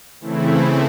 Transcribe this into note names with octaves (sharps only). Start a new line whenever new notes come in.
C#3 E3 A3 C4 E4